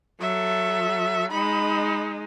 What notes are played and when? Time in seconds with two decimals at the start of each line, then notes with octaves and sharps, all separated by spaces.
0.21 F#3 A4 E5
1.31 G#3 D#4 B5